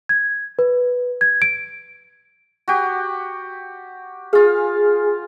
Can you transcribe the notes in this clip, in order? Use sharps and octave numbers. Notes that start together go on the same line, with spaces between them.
G#6
B4
G#6
D7
F#4 G4
F4 G#4 F5